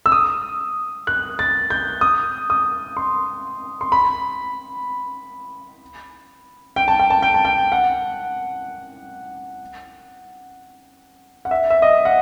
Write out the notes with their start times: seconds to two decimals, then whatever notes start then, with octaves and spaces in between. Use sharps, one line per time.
0.06 E6
0.12 D#6
1.07 F#6
1.39 A6
1.70 G6
2.01 D#6
2.50 D#6
2.97 C6
3.81 C6
3.92 B5
6.76 G5
6.88 A5
7.00 G5
7.10 A5
7.23 G5
7.34 A5
7.45 G5
7.72 F#5
11.45 F#5
11.51 E5
11.70 E5
11.82 D#5
12.05 F#5